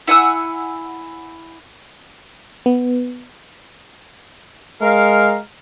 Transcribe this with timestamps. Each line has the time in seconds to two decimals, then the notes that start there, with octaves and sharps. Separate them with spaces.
0.07 E4 F#5 G#5 E6
2.66 B3
4.81 G#3 A#4 F5